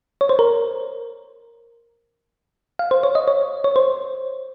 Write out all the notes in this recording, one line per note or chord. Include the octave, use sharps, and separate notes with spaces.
C#5
C5
A#4
F5
C5
C#5
D#5
C#5
C#5
C5